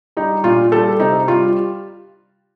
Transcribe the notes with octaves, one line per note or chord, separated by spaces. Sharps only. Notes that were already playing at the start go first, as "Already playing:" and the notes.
G3 D#4
A#2 F4
G3 A4
C3 D#4
G3 F4